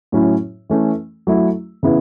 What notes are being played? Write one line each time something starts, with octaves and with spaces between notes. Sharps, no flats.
A2 F#3 C#4 E4
E3 A3 C#4
F#3 A3 E4
C#3 E3 B3 E4